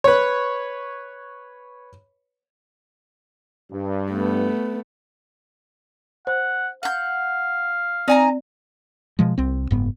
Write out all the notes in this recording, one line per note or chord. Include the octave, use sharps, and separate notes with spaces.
B4 C#5
G2
A3 B3
C5 F#5
F5 F#5 G6
C4 D#4 D5 G#5 A#5
B2 F3 G#3
C2 C4
F#1 G#2 B3